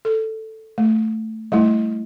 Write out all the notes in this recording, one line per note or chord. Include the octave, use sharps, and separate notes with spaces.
A4
A3
G3 A3 E4